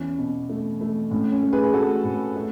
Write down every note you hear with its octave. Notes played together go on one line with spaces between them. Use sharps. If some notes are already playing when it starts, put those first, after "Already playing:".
Already playing: E2 E3 C#4
B2
A3
A3
A2 C#4
C#4
A3
G#4 B4
G#4
A3 F#4 A4
A2
A3